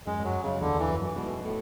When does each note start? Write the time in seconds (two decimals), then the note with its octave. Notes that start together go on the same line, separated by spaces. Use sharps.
0.07 F#2 G#3
0.19 F#2
0.25 F#3
0.43 F#2 C#3
0.61 E2 D3
0.74 E2
0.79 E3
0.88 F#2
1.02 F#2
1.16 G#2 B2
1.28 F#2
1.43 A2